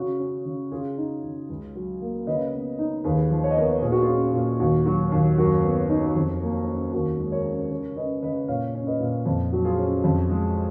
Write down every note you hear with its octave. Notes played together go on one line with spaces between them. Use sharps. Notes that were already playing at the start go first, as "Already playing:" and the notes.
Already playing: C#3 F#4
C#4
C#3
C#3 F4 G#4
D#4
C#3
C#2
F#3
A#3
C#3 B4 D#5
B3
D#4
D#2 G#4 B4
F3
C#5
D#5
B3 A#4 C#5
A#2 G#4
F#4
F4 G#4
C#4
A#2
D#2 F#4
F#3 F#4
D#2
F#2 F#4 A#4
B3
D#4
F2
A#3
C#4
D#2 F#4 A#4
G#3
A#4 C#5
C#4
C#3 A#4 C#5
C#4 B4 D#5
C#3 B4 D#5
A#2 C#5 F5
C#4
B4 D#5
A#2
F2
F#3
F4 G#4
C#4
F2
G#3